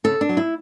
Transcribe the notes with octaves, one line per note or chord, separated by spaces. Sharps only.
C#3 A4
D4
F#3
E4